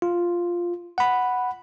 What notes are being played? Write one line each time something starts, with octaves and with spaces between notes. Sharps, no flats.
F4
F#5 B5